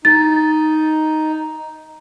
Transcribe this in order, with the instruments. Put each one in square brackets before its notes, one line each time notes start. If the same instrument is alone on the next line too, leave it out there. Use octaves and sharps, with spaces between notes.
[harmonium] D#4 [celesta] A6